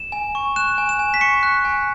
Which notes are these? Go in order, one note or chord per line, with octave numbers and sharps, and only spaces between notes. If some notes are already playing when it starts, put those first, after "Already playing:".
Already playing: E7
G#5
C#6
F#6 E7
G#5
E7
G#5
B6
C#6 C#7
F#6
G#5